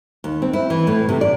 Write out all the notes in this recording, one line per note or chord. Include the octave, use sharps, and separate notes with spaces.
D#2
C4
E4
E3
A2
C3
D5